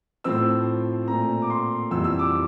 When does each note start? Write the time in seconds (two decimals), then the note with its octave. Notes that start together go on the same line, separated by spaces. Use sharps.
0.24 A2 F3 C4 E6
1.08 A#2 A3 C4 A#5
1.42 D6
1.50 C6
1.91 F2 E3 G3 E6
2.04 E6
2.19 D6